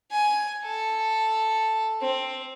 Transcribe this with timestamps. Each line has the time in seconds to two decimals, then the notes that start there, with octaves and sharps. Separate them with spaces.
0.11 G#5
0.63 A4
2.01 C4